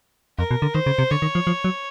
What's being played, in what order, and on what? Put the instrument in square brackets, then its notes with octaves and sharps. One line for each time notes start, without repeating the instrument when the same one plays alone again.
[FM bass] F2 [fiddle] A#4
[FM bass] B2
D3
[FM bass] D#3 [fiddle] C5
[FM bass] C#3
C3
[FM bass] D3 [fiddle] C#5
[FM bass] D#3
F3
F3
F#3